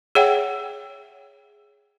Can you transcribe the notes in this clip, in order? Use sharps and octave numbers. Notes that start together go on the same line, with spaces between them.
G#4 C#5 E5 F#5 G5